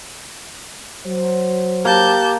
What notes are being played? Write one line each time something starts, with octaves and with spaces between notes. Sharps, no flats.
F#3 C5
A#3 G4 A5 G6